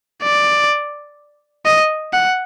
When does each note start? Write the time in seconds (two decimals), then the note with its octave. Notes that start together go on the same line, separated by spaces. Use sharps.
0.23 D5
1.65 D#5
2.13 F#5